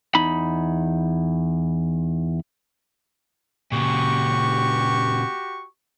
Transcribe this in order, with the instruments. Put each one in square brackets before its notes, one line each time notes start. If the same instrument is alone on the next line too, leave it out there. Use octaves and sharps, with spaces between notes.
[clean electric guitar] E2 D#4 B5
[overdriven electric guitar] A#2 C#3 [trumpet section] F#4 G4 C#6